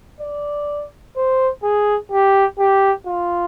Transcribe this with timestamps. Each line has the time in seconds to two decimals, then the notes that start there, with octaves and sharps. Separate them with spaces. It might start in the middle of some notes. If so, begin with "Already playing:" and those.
0.20 D5
1.16 C5
1.63 G#4
2.12 G4
2.59 G4
3.07 F4